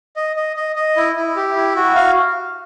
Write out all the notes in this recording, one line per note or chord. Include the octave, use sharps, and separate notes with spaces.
D#5
D#5
D#5
D#5
E4
E4
G4
E4
F#4
F5